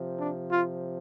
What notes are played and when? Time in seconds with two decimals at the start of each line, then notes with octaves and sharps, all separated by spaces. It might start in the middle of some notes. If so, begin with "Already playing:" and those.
Already playing: C3 F3
0.18 D4
0.51 F4